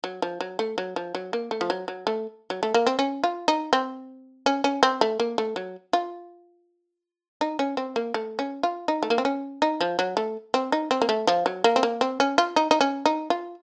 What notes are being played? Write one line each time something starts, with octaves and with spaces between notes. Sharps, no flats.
F#3
F3
F#3
A3
F#3
F3
F#3
A#3
A3
F3
F#3
F#3
A3
F#3
A3
A#3
C4
C#4
F4
D#4
C4
C#4
C#4
C4
A3
A#3
A3
F#3
F4
D#4
C#4
C4
A#3
A3
C#4
F4
D#4
A3
A#3
C4
C#4
D#4
F3
F#3
A3
C4
D#4
C4
A#3
A3
F3
F#3
A#3
C4
A#3
C4
C#4
F4
D#4
D#4
C#4
D#4
F4